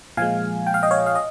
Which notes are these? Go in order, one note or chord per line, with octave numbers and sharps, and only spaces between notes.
A#2 F3 G#3 F5 G#5
G5
F5
D#5 G5
C#5 F5
F5
D#5